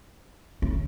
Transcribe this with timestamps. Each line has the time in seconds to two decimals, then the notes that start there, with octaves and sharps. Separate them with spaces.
0.62 C#4